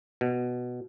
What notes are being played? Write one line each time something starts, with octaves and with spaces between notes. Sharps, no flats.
B2